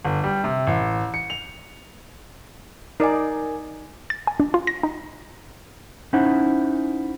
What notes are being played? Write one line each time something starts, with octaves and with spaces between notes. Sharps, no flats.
G1
G3
C3
A1
C#7
F7
D#4 A#4 D5 G#5
A6
G#5
D4
F4
A#6
D#4
C#4 D#4 E4 C5 F#5